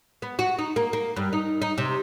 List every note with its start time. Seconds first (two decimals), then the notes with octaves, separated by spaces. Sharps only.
0.22 B3
0.39 F#4
0.59 D#4
0.76 A#3
0.93 A#3
1.16 G2
1.33 D#4
1.62 D#4
1.78 C3